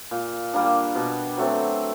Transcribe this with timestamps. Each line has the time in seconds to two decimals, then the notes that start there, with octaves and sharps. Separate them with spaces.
0.11 A#2
0.54 G3 A#3 D4
0.95 B2
1.37 F#3 A3 C4